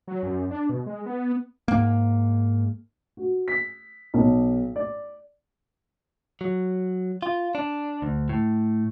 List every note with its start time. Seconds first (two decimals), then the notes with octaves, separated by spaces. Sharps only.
0.07 F#3
0.23 F#2
0.51 D4
0.69 B2
0.86 G#3
1.06 B3
1.68 G#2 A#3
3.17 F#4
3.48 B6
4.14 B1
4.76 D5
6.41 F#3
7.23 F4
7.55 D4
8.02 D2
8.29 A2